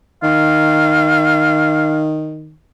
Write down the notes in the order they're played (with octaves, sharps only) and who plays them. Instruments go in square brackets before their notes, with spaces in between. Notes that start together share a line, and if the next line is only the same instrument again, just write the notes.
[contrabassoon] D#3 [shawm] F5